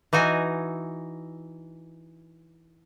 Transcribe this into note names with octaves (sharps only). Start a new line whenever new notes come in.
E3 D#4 F#4 G#5